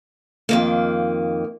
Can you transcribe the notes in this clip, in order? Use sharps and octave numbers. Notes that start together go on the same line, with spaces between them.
F2 D#3 A#3